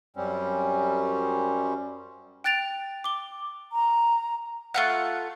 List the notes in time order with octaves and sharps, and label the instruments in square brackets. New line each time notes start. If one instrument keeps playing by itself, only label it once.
[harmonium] F#2 G3 C4 C#4
[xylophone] G5 F#6 A6 D7 F7
D6 G7
[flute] A#5
[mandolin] A3 F4 F#5